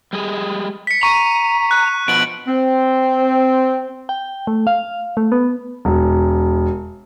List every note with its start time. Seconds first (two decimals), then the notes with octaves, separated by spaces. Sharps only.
0.13 G3 G#3 G#4
0.87 B6 C#7
1.03 A#5 C#6 D#7
1.71 F#6
2.08 B2 F3 F#4 D7 F#7
2.48 C4
4.09 G5
4.47 A3
4.67 F5
5.17 A3
5.32 B3
5.85 E1